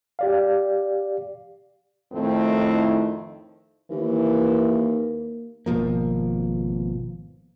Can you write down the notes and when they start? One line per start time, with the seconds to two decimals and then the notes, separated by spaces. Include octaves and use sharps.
0.19 G4 D5 F5
2.13 F2 A2 D#3 A3 C4 E4
3.91 D#2 E3 A#3
5.66 G#1 B2 F3 A#3